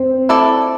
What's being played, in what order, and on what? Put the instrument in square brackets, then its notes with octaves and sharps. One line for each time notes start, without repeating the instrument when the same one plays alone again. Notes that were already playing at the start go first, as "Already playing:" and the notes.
Already playing: [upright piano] C4
[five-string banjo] E4 A4 D5